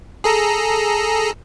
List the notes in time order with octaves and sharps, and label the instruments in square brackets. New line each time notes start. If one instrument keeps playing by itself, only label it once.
[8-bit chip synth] G#4 A4 A#5